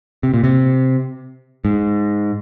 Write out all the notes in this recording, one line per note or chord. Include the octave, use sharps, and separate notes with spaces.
C3
A#2
C3
G#2